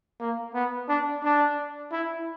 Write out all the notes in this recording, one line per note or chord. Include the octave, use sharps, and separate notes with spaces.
A#3
B3
D4
D4
E4